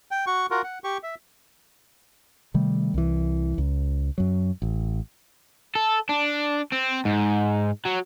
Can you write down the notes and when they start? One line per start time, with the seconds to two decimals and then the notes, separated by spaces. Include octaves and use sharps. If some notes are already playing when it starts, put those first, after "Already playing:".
0.11 G5
0.27 F#4 C#6
0.51 F4 F#4 A#4
0.64 F#5
0.84 G4 C#6
1.03 E5
2.54 C3 D#3 G3 A3
2.94 C2 E3
3.58 C#2
4.18 F#2 F#3
4.62 A1
5.75 A4
6.09 D4
6.72 C4
7.05 G#2
7.85 F#3